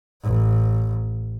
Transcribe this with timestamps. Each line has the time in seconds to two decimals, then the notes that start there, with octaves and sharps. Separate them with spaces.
0.23 A1